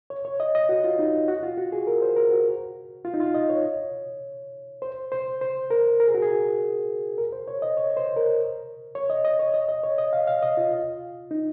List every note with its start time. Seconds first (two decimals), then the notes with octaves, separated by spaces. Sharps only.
0.10 C#5
0.25 C#5
0.40 D#5
0.55 D#5
0.69 F#4
0.84 F4
0.99 D#4
1.28 F#4
1.43 F4
1.58 F#4
1.72 G#4
1.87 A#4
2.02 C5
2.16 A#4
2.31 F#4
3.05 F4
3.14 D#4
3.20 F4
3.34 D#5
3.49 C#5
4.82 C5
5.12 C5
5.41 C5
5.70 A#4
6.00 A#4
6.08 G#4
6.14 F#4
6.22 G#4
7.18 A#4
7.32 C5
7.48 C#5
7.62 D#5
7.77 C#5
7.97 C5
8.16 A#4
8.95 C#5
9.10 D#5
9.25 D#5
9.39 C#5
9.54 D#5
9.68 D#5
9.83 C#5
9.98 D#5
10.13 F5
10.27 F5
10.42 D#5
10.57 F4
11.31 D#4